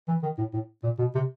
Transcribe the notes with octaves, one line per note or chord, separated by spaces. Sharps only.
E3
D#3
A2
A2
A#2
B2
C3